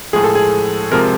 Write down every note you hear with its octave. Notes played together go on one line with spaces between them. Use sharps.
A2 F3 G#3 G#4
A4
G#4
C3 F3 G#3 A#4